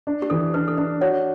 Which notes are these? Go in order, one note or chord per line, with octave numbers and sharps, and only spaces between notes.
D4
G4
E3 A4
D4 B4
A4
D4 B4
F#4 C#5